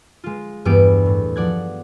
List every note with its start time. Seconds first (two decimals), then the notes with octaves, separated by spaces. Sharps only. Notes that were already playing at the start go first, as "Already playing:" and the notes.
0.24 G#3 F4
0.65 E2 G2 G3 B3 D5 D7
1.06 A2
1.36 F3 D5 F#5 G#6